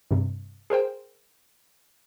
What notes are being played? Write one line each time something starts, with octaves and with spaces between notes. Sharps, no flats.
G2 C3
G#4 A#4 C5 G5